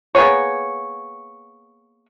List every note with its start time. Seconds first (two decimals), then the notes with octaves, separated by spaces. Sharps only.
0.15 A#3 B3 G#4 C#5